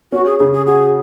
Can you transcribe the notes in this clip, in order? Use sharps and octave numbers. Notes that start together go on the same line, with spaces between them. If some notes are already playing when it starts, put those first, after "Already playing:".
C#4 F#4
G#4
C#3 G#4
G#4
F#4 G#4